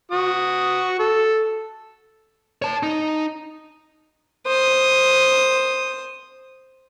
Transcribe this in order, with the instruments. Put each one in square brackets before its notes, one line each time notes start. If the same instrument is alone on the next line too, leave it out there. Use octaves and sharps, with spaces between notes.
[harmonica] F#4 D#6
A4
[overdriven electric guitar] C#5 A5
D#4
[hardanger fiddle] C5 D#6